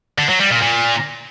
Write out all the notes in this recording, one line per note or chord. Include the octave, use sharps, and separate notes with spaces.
D3
F#3
G3
A#2
A#2